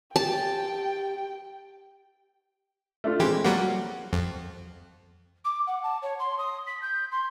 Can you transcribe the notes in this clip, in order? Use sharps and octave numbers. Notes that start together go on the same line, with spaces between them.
G4 G5 A5
A3 D4 F4
E3 G#3 C4 G4
F#3 G3 A#3 F#5
F2
D6
F#5
A5
C#5
C6
D#6
B6
G6
C6